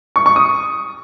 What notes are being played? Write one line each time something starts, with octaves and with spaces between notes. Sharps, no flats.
C#6
C#6
D#6